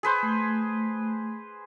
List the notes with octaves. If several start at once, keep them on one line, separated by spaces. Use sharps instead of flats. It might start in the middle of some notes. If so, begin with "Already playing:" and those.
G#4 B4 C5
A3